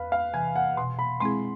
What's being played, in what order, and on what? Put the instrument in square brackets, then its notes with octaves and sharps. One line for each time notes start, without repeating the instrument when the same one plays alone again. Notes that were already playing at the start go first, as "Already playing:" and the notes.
Already playing: [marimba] E2 [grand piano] B4 F5
[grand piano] F5
[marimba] C3 E3 [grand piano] G#5
[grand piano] F#5
[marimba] B2 [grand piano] C6
[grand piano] B5
[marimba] G#3 C4 E4 G#4 [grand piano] C6